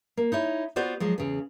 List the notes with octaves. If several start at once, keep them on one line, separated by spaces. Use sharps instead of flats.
A#3
D#4 E4 C#5
B3 F4 F#4 C5 D5
F3 F#3 G#3
E2 C#3